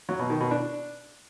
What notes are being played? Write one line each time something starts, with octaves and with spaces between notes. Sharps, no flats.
F#3
B2
D#3
B2
D4